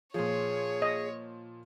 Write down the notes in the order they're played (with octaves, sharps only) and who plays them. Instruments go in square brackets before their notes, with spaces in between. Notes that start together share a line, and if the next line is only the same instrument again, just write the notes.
[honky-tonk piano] A#2 F3 [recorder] G#4 [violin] C#5
[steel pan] D#5